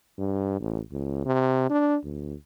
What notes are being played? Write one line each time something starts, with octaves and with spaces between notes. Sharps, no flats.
G2
A1
C#2
C3
D4
D2